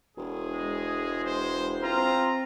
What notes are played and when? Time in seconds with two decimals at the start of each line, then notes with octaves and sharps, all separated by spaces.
0.17 E1 G#4
0.53 G#3
1.24 C5
1.83 C4 F4 A#5